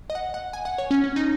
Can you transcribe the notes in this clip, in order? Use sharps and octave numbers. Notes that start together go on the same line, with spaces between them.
D#5
F#5
F#5
G#5
F#5
C#5
C#4
C#4
D#4